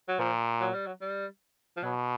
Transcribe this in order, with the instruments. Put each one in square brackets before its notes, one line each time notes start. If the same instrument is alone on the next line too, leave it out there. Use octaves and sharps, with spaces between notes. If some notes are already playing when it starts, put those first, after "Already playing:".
[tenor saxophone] F#3
[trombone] A#2 [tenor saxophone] F3
[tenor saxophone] F#3
G3
F#3
G3
F3
[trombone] B2 [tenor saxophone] F#3